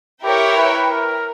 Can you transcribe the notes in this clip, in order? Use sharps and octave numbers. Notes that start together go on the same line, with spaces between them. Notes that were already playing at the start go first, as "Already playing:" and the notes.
E4 G4 A#4 C#5 E5 G5
B4
A#4